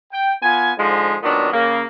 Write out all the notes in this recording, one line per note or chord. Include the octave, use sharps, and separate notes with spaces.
G5
B3 F4 G#5
G#2 D3 F3 G#3
A#2 D#3 F#3 B3 D4
C#3 A#3